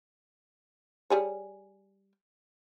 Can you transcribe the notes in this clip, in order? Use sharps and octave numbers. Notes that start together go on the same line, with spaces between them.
G3 G#4 C#5